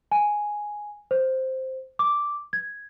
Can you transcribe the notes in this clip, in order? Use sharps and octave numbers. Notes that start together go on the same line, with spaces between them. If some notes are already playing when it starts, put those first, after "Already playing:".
G#5
C5
D6
G#6